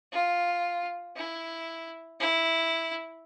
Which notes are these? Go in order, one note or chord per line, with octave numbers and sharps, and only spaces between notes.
F4
E4
E4